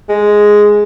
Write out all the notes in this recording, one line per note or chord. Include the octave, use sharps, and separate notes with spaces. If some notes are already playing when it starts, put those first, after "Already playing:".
G#3